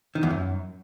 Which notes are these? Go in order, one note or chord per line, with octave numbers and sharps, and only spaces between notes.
D#3
E2
F#2